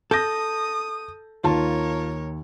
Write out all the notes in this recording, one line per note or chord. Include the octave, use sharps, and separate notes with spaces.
A4 D#6 G6 A#6
D#2 F4 A#4 C#5 A5